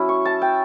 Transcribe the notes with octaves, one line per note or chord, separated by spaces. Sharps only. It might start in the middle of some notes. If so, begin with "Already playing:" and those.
Already playing: F#3 C#4 E4
C#6
A5
G5